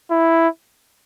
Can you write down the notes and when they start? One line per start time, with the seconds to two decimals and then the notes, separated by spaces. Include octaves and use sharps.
0.11 E4